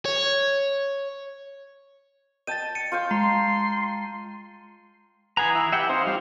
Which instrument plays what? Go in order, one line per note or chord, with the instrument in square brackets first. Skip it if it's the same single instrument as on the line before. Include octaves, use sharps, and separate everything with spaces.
[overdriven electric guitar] C#5
[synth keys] D#5 [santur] G5 A5 [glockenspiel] A6 D#7
[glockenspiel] C#7 D#7
[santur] F4 F5 G5 [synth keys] C#6 G6
[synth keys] G#3 [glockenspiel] A#5 [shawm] C6
[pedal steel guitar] E3 G#4 A#5 [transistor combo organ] B4 F#5 G#5
[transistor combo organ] E4
[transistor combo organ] G4 [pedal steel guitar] E5 F#5 G5
[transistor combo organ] C4 D#4 [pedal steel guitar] C5 F5
[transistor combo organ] G3 F4